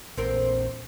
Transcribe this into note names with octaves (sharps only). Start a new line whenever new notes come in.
A#1 E2 C4 A#4